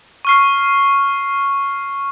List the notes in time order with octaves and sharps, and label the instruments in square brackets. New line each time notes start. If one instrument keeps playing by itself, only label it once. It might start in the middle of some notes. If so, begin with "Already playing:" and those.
[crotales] C#6 F6 C7